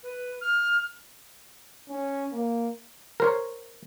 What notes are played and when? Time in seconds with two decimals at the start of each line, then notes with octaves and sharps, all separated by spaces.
0.03 B4
0.41 F6
1.89 C#4
2.32 A#3
3.20 A#4 C5 C#5